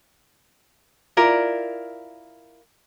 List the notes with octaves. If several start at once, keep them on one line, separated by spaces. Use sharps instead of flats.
E4 F4 A#4 D5